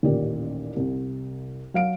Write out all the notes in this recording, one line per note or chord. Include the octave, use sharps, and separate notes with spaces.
A1 D#2 A#2 G4 D5
C2 C3
F#3 F5 D7